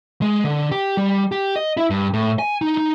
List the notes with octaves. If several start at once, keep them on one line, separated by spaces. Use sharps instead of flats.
G#3
D3
G4
G3
G4
D#5
E4
G2
A2
G#5
D#4
D#4